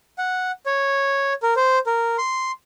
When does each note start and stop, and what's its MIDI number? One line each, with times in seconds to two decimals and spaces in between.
0.18 0.51 78
0.66 1.33 73
1.43 1.54 70
1.56 1.79 72
1.86 2.17 70
2.18 2.52 84